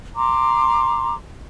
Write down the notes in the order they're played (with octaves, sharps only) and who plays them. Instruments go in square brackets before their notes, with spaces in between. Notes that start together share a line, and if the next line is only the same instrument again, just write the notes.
[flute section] A#5 C6 D6